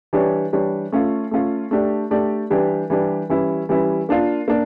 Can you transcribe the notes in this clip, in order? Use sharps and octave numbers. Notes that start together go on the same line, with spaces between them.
E3 G3 D4 G4 C#5
E3 G3 D4 G4 C#5
A3 C#4 F4
A3 C#4 F4
A3 D4 G4 D5
A3 D4 G4 D5
E3 G3 D4 G4
E3 G3 D4 G4
E3 G3 C#4 E4
E3 G3 C#4 E4
A#3 D4 F4
A#3 D4